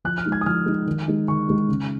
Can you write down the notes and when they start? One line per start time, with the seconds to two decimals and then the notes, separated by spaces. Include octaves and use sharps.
0.04 F3 F#6
0.18 F6
0.25 G#3 D#4
0.32 G#6
0.41 D#6
0.46 F3 F6
0.66 G#3 D#4
0.87 D#3
1.08 G#3 D#4
1.28 D#3 C#6
1.48 G#3 D#4
1.68 C#3